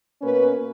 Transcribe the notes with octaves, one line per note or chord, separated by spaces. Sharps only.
B2 A#3 C#4 B4